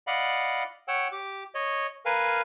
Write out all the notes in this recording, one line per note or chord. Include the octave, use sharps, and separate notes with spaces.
D5 D#5 F5 F#5 B5
C#5 F#5 G5 E6
G4 D6
C#5 D#5
A#4 B4 F5 G#5